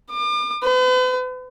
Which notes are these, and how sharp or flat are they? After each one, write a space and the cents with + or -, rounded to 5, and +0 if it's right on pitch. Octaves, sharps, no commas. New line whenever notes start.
D6 +40
B4 +45